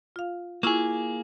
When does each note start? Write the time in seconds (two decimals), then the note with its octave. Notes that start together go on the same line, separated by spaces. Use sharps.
0.16 F4 F5
0.63 A#3 E4 F4 G#4 C#6